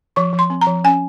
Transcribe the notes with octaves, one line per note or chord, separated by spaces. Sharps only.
F3 C#6
F3
C6
C4
A#5
F3
C#4 G#5